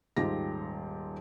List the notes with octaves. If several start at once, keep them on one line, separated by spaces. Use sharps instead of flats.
D#1 G#2 F4 G4 A#6